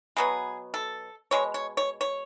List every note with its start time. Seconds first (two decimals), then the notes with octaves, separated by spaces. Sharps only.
0.17 B2 F#3 B3 G#4
0.74 A4
1.31 B2 G#3 C#5
1.54 C#5
1.77 C#5
2.01 C#5